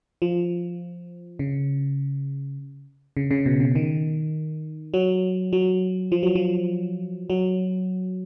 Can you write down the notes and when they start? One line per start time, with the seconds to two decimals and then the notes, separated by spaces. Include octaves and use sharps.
0.22 F3
1.39 C#3
3.17 C#3
3.31 C#3
3.46 B2
3.60 C#3
3.75 D#3
4.94 F#3
5.53 F#3
6.12 F3
6.23 F#3
6.35 F3
7.30 F#3